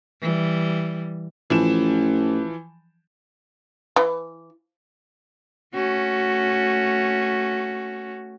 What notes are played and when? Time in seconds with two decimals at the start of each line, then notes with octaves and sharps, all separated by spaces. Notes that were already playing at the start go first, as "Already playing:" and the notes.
0.22 E3 G3
1.50 A1 E3 F3 E7
3.96 E3
5.74 A3 C#4 F#4